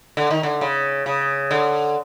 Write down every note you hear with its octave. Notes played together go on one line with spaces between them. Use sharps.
D3
D#3
D3
C#3
C#3
D3